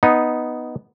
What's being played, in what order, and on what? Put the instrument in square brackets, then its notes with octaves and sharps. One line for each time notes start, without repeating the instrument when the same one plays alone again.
[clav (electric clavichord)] B3 D#4